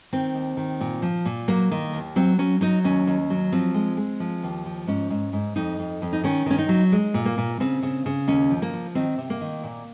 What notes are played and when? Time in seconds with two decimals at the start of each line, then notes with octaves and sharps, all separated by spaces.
0.13 D#3 C4
0.35 D#2
0.57 D#3
0.81 A#2
1.02 F3
1.25 A#2
1.48 F#3 A#3
1.71 D#3
1.93 D#2
2.16 F#3 C4
2.39 F#3 C#4
2.61 F#3 D#4
2.84 D#2 C#4
3.07 D#2
3.30 F#3
3.52 F3 C4
3.74 G#3
3.97 G#3
4.20 F3
4.43 D#2
4.66 F3
4.87 G#2 C#4
5.10 G#2
5.33 G#2
5.56 F2 D#4
5.79 F2
6.02 F2
6.13 D#4
6.24 D#3 C#4
6.46 D#3 C#4
6.59 D#4
6.69 F#3
6.92 G#3
7.14 A#2
7.26 A#3
7.38 A#2
7.60 C#3 C4
7.83 C#3
8.06 C#3
8.28 D#2 C#4
8.50 F3
8.62 A#3
8.73 F3
8.95 D#3 C4
9.18 C3
9.30 A#3
9.41 D#3
9.64 A#2